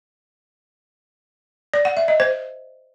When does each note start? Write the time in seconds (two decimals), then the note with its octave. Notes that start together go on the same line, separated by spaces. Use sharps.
1.74 D5
1.85 F#5
1.97 E5
2.08 D#5
2.20 C5